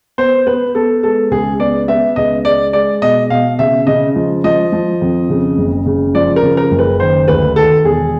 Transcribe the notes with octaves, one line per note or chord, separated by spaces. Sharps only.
B3 C5
B3 B4
B3 A4
G#3 A4
C#2 G#4
B3 D5
B3 E5
C#2 D#5
G#3 D5
G#3 D5
B2 D#5
B2 F5
C#3 E5
C#3 D#5
F3
F3 D#5
F3
F2
C#3
F#1
C#3
F3 D5
A#4
C#3
A#4
F#1
B4
D#3 C5
D2 B4
D#3 A4
E1 G#4